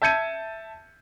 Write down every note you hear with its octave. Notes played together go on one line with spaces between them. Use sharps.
E5 A5 G6 G#6 C#7 D#7